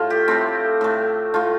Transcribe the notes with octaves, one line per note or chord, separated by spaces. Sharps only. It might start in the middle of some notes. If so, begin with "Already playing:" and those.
Already playing: A2 A3 F4
G4
A2 A3 C4
A2 A3
A2 A3 F4